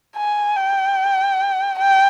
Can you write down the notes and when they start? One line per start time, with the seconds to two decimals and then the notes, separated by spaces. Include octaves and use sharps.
0.17 G#5
0.56 G5
1.79 G5